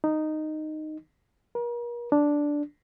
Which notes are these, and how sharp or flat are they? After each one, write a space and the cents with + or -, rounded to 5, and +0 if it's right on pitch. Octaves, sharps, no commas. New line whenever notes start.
D#4 -10
A#4 +40
D4 -5